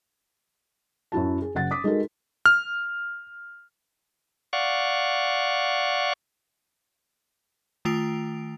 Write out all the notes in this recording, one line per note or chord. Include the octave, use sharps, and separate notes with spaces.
F#2 F#3 E4 F#4 A5
G#4
F#1 F#5 A6
D6 D#6 B6
G#3 D#4 F#4 A4 A#4
F6
D5 F5 F#5 C#6
D#3 A3 F4 G5 D7